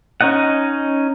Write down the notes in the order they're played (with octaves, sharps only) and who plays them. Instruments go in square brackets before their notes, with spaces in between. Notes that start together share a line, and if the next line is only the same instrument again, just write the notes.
[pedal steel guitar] C#4 D#4 D#5 F#5